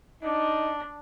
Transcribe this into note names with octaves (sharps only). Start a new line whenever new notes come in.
D4 D#4